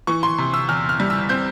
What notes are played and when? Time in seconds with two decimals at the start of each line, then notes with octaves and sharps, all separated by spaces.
0.07 E3 C#6
0.23 C6
0.38 C3
0.54 E6
0.69 E2 F6
0.89 F6
1.00 G3
1.10 E6
1.29 C4 G6